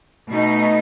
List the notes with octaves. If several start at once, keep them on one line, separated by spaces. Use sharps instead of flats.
B2 A3 D#4